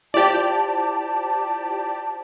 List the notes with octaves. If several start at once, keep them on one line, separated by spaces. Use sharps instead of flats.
E4 F4 G4 C5 D5 A5